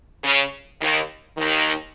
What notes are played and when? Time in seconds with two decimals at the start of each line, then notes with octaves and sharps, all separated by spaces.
0.23 C#3
0.81 D#2 D#3
1.37 D#2 D#3